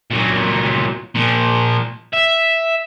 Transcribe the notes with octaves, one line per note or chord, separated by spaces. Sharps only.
A#2 F#3
A#2 F3
E5